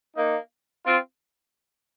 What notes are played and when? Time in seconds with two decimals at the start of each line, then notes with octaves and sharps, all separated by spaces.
0.16 A#3 D#4
0.85 C4 F4